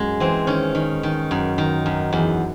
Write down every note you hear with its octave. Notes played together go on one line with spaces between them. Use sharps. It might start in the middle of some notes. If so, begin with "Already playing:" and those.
Already playing: F#2 G#3
E3 C4
D#3 C#4
D#3
D#3
F#2
D#3
F#2
E2